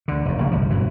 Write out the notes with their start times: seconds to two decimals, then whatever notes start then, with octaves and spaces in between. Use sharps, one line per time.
0.08 D2 D3
0.25 F1 D#2
0.38 A#1 C#3 A#3
0.51 G1 C2 F3
0.70 F1 G2 B2 E3